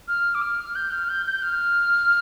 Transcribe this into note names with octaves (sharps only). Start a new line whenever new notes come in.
F6
D6
F6
G6
F6
G6
G6
F6